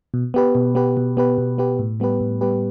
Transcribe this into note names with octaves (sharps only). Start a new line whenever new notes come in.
B2
B3 G4 B4
B2
B3 G4 B4
B2
B3 G4 B4
B2
B3 G4 B4
A2
G3 B3 G4 B4
A2
G3 B3 G4 B4